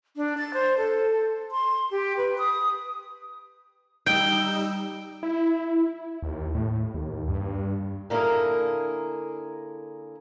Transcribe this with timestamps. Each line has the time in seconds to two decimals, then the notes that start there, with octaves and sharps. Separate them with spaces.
0.17 D4
0.38 A6
0.54 C5
0.78 A4
1.52 C6
1.91 G4
2.17 B4
2.38 D#6
4.06 G3 D#4 G5 E6
5.23 E4
6.22 D#2
6.55 A2
6.94 D#2
7.28 G2
8.10 D3 A#3 E4 F4 G#4 A#4